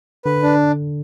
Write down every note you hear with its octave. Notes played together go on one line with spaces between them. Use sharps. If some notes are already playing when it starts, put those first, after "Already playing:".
D3 B4
D4